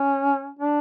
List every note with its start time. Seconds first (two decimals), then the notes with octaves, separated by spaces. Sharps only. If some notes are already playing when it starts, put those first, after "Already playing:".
Already playing: C#4
0.59 D4